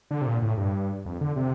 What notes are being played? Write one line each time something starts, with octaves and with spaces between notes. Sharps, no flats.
D3
C3
A#2
A2
G2
F2
D3
C3